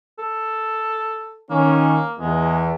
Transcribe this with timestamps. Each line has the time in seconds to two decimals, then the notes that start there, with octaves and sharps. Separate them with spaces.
0.19 A4
1.50 D#3 A#3 C#4
2.20 E2 G#3